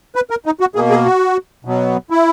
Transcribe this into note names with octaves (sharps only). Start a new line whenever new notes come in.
B4
A#4
D#4
F#4
B2 A#3 G#4
G#4
F#4
B2 F#3 B3
E4